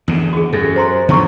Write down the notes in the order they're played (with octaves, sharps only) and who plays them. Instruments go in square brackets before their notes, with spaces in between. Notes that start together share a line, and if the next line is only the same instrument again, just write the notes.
[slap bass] E2 D3
[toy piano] F#4 G#4
[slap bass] F#2 [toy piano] A4
[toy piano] C5 A#5 C6
[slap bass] D3 F3 B3 [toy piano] C#5 A#5 C#6